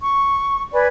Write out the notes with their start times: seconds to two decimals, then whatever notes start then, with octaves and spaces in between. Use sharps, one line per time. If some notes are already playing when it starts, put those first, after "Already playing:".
0.01 C#6
0.73 B4 D5 G#5 B5